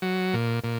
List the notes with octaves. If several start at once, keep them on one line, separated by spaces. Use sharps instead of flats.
F#3
A#2
A#2